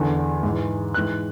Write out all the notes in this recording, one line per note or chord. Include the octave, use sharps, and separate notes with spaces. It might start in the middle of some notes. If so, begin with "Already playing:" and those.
Already playing: E2 D3
G#2 E3
G#2 E3 F#6